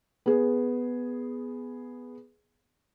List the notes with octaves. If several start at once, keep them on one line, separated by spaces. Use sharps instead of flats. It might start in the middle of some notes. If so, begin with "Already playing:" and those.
B3 G#4